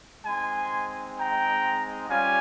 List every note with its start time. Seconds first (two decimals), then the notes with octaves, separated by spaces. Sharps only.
0.25 G#3 C4 D#4 G#5 C6
1.17 G5 A#5
2.09 G3 C#4 F4 F5 G#5